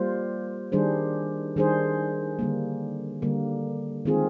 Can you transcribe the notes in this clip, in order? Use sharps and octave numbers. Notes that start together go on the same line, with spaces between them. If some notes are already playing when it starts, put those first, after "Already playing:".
Already playing: G3 A#3 F4 C5
D#3 G3 D4 G#4 C5
D#3 G3 D4 G#4 C5
D3 G3 A#3
D3 G3 A#3
D#3 G#3 C4 F4 G#4